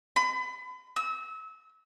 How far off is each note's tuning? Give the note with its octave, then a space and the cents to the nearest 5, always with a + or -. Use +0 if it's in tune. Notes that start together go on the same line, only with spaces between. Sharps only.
B5 +35
E6 -30